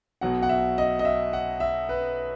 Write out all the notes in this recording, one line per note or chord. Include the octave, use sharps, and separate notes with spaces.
B1 B2 F#3 F#5
F#5
E5
D#5
D#5
E5
F#5
E5
B4